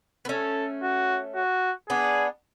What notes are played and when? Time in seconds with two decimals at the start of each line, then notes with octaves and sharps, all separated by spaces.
0.25 B3
0.29 A3 C#4 A4
0.83 F#4
1.35 F#4
1.89 B3 D4 G#4